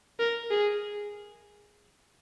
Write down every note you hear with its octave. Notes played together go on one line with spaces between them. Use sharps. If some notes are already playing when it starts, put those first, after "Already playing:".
A#4
G#4